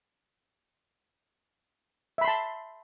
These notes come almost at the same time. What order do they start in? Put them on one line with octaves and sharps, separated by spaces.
E5 B5 C6 A5